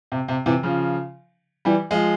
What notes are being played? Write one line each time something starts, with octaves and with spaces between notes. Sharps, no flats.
C3
C3
C3 E3
C#3 F3
E3 G3
F3 G#3